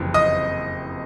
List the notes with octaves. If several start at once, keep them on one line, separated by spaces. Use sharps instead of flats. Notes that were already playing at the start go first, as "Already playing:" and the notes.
Already playing: F#1 F2 C3 E3
D#5 D#6